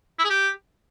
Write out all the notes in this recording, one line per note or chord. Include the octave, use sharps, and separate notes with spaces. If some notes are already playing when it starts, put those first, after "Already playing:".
E4
G#4
G4